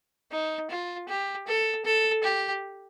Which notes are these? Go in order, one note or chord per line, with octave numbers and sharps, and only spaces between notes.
D#4
F4
G4
A4
A4
G4